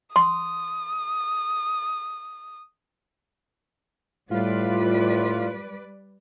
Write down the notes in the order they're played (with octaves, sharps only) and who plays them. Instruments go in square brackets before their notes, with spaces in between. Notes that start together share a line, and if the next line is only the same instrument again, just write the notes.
[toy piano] C6 [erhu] D#6
[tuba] A2 [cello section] G3 B4 D5 [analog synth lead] F4